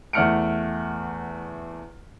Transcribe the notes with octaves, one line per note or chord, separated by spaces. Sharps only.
E2 A3 F#5 F6 C#7 D7